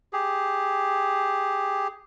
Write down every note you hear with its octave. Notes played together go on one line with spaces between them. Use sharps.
G4 G#4